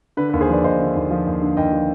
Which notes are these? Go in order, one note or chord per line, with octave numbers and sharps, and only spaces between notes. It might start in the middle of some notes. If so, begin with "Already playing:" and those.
D3 B4
B4
D#2
G#4 C5
F3 B4 D5
D#2 C5 D#5
D3
D#2
F3
D#2
D3
D#2 D#5 G5
F3